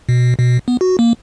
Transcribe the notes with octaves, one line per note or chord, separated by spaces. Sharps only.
B2
B2
B3
F#4
A#3